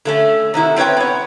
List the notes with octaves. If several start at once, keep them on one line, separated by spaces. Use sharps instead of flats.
D3 A3 C#4
C3 D#3 E4 F#4
C4 C#4 B4 C#5 G5
B3 C#5